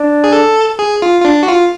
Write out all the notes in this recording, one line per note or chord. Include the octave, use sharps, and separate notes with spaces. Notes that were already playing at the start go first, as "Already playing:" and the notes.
Already playing: D4
G#4
A4
G#4
F4
F4
D4
F#4
F4